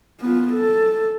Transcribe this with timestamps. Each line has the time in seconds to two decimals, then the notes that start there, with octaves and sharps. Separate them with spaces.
0.21 B3 F4
0.53 A4